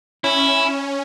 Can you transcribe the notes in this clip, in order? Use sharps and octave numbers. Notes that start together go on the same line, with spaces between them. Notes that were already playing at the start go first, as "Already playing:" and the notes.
C#4 E4